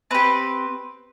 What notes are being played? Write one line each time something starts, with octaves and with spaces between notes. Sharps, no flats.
C4 G4 B4